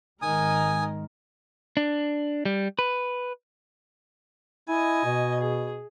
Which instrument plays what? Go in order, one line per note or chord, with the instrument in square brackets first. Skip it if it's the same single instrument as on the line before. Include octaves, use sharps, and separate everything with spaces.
[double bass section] G#1 D#3 G#3 [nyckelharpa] D#4 A#4 [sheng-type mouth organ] G#5 D#6
[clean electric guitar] D4
G3
B4
[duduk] E4 [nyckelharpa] D#5 G#5
[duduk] B2
[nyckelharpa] G#4